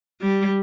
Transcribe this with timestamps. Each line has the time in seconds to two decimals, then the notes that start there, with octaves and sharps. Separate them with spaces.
0.21 G3